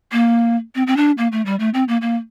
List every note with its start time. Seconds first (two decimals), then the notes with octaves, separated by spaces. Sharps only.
0.12 A#3
0.75 C4
0.87 C4
0.96 D4
1.18 A#3
1.32 A3
1.46 G3
1.59 A3
1.74 C4
1.88 A#3
2.01 A#3